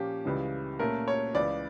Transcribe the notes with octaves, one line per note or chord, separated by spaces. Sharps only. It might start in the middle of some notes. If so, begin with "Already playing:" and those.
Already playing: A#2 F3 A#3 C#4 G4
C#2 C#3 E3 G3
A#2 A3 C#4 A#4
C#5
C#2 C#3 E3 D5